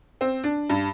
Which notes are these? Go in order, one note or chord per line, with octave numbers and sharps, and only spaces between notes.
C4
D4
G2